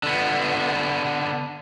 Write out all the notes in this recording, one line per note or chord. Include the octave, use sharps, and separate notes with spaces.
D3 B3